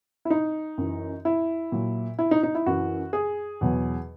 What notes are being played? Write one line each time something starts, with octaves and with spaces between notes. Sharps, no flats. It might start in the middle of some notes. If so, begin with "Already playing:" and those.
E4
D#4
F#2 E3
E4
A#2 F#3
E4
D#4
D#4
E4
F#2 E3 F#4
G#4
E2 B2 F#3